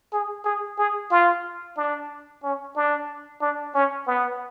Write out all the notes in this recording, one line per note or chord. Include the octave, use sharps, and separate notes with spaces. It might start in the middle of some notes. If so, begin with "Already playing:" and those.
G#4
G#4
G#4
F4
D4
C#4
D4
D4
C#4
B3